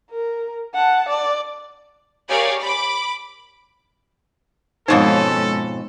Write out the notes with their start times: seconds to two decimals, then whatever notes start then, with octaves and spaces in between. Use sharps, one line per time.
0.11 A#4
0.75 F#5 A5
1.10 D5
2.29 G4 G#4 A#4 C#5 D5 F5
2.63 B5 D6
4.88 F2 G#2 B2 C#4 D#4 A4 C5